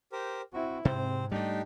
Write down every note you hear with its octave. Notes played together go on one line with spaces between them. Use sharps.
G4 A#4 C5
C4 E4 F#4
G#2 C3 C4 C5
G3 A3 D4 D#4 G4